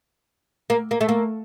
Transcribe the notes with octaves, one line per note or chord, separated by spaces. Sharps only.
A#3
A#3
A3
A#3